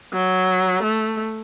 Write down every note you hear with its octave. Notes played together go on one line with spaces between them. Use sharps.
F#3
A3